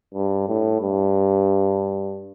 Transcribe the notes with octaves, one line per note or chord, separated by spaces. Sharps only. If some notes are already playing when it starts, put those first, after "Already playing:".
G2
A2
G2